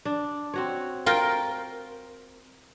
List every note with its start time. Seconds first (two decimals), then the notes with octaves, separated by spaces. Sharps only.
0.05 D4
0.54 C4 F#4 C#5
1.06 F4 A#4 G5